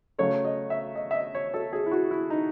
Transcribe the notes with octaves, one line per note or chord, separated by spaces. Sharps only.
C#3 F#3 A3 C#5
D#5
E5
D#5
E5
D#5
C#5
A4
G#4
E4
F#4
E4
D#4